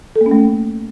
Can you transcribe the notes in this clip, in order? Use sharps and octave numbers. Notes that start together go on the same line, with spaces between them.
A4
A#3
C#4
A3